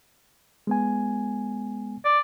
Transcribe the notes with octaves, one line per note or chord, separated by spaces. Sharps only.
G#3 B3 G#5
D5